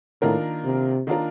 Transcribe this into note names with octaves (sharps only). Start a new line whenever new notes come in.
A2 D#3 A#3 D4 F4 A#4
C3
D#3 A#3 D4 F4 A#4